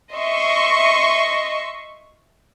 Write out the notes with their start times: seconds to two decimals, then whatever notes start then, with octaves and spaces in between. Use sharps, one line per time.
0.13 D#5 E5 C6 C#6